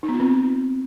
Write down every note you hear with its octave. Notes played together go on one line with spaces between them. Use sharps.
D#4
B3
F4
C4